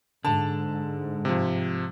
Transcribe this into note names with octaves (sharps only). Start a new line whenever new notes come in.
G#2 D3 A5
C3 F3